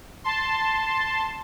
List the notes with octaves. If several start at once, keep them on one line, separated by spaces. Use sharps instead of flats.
A5 C6